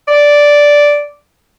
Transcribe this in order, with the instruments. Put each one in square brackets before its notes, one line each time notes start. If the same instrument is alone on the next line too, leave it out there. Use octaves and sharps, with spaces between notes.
[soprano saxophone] D5